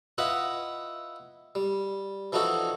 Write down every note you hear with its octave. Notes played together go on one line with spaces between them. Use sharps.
E4 F4 B4 D#5 F#5 B5
G3
E3 F3 D4 D#4 F#4 A4